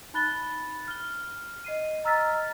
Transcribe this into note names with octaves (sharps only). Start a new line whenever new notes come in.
D#4 B5 F#6 A6 G7
F6 G7
D#5 C7 D#7
D#5 A#5 E6 F6 A6 B6